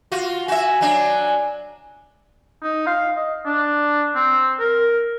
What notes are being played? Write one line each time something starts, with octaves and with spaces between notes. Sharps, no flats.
F4 F#4
F#4 E5 G#5
F#3 D4
D#4
F5
D#5
D4
C4
A#4